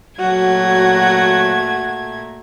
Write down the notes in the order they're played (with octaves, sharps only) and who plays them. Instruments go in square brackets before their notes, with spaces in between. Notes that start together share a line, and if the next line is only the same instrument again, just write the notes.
[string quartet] A#2 A3 G#6 [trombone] F#3 [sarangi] F#4